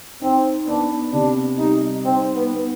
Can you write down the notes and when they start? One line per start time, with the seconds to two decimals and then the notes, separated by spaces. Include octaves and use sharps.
0.22 C4 D#4
0.67 B3 D4
1.13 C3 D4
1.59 G3 D#4
2.05 C4 D#4
2.35 B3
2.50 B3